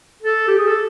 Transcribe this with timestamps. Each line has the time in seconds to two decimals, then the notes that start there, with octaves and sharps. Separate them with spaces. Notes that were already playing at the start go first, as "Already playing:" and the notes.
0.22 A4
0.48 G4
0.58 G#4
0.67 A4